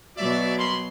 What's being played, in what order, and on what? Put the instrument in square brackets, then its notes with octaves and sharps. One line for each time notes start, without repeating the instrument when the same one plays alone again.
[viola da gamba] B2 F#3 [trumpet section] D5 E5
[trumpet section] A#3 B5 C6